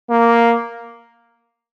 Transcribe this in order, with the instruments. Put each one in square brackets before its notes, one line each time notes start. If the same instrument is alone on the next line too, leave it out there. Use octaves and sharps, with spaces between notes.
[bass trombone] A#3